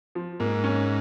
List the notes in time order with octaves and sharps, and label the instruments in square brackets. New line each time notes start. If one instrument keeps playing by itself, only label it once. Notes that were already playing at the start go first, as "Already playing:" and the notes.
[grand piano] F3
[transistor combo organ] G#2 [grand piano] A#3
[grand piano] C#4